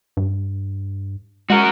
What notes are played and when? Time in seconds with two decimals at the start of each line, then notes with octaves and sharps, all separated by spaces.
0.17 G2
1.50 G#3 F#4 A#4